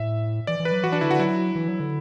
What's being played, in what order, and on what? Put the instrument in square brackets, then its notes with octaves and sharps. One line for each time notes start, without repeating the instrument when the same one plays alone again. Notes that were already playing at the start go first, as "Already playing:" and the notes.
Already playing: [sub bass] A2 [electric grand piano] E5
[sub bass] E3 [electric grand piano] D5
[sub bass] E3
[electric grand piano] B4
[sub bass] F#3
[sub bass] E3 [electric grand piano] F#4
[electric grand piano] D4
[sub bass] D3 [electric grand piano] E4
[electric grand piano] F#4
[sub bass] F#3 [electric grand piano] E4
[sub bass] E3
F#3
D3